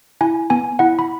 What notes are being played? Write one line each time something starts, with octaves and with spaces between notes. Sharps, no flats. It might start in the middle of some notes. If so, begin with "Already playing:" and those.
E4 G#5
B3 G#5
E4 F#5
B5